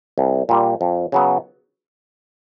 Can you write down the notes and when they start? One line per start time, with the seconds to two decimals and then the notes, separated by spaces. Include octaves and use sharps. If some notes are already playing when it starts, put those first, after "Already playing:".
0.18 C2
0.49 A#2 G3
0.81 F2
1.12 C#3 F#3 B3